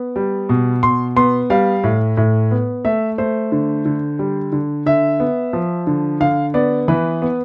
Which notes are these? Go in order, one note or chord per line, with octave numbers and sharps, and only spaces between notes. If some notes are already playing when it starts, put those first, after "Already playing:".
Already playing: B3
G3
B2
B2 C6
B3 C6
G3 F5
A2
A2
B3
A3 E5
A3 C5
D3
D3
G3
D3
D3 E5
B3
F3
D3
D3 F5
B3 D5
E3 B4
B3